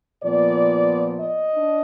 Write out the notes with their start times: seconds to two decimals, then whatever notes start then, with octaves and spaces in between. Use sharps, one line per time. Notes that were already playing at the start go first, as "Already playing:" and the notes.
0.23 A#2 F3 B3 D5
1.21 D#5
1.53 D4